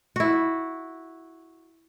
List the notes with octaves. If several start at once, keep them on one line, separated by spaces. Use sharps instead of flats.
E4 F#4